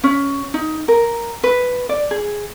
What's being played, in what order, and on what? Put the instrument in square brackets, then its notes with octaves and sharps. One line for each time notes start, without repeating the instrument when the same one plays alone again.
[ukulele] C#4
D#4
A#4
B4
D5
G#4